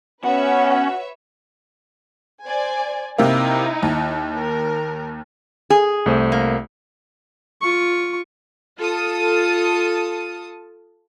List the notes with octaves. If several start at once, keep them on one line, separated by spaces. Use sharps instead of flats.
B3 C#4 F#4 B4 C#5 E5
C5 D5 G#5
C3 A#3 D#4 E4
D#2
A#4
G#4
C2 A3 C5
A#3
F4 C#6
F4 A4 A5 D#6